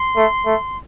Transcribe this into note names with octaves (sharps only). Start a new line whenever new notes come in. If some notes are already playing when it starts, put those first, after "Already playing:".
Already playing: C6
A3
A3